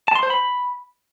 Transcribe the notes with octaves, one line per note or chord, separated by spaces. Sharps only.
A5
C6
C5
B5